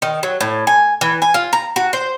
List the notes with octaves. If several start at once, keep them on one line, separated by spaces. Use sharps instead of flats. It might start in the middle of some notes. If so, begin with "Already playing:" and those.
D#3
F#3
A2
G#5
E3
G#5
F4
A#5
F#4
C5